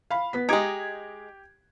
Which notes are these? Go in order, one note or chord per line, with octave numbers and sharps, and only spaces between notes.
F5 B5
B3 B6
G#3 D#4 G4 G#6 D7